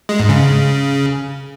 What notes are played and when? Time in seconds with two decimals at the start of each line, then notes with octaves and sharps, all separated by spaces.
0.09 G#3
0.20 G#2
0.29 C#3